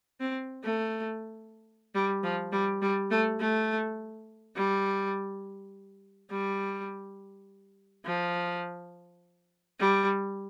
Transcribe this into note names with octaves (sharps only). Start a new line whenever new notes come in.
C4
A3
G3
F3
G3
G3
A3
A3
G3
G3
F3
G3